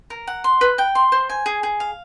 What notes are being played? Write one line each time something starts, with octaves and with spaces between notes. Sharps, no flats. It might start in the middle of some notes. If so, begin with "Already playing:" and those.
A#4
F#5
C6
B4
G5
C6
C5
G#5
G#4
G#4
F5